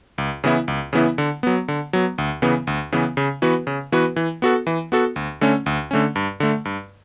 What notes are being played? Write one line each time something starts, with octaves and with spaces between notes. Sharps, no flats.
C#2
C#3 E3 B3 E4
C#2
C#3 E3 B3 E4
D3
F#3 B3
D3
F#3 B3
D2
C#3 E3 B3
D2
C#3 E3 B3
C#3
E3 B3 F#4 B4
C#3
E3 B3 F#4 B4
E3
B3 F#4 A4
E3
B3 F#4 A4
D2
D3 A3 C#4
D2
D3 A3 C#4
G2
D3 A3
G2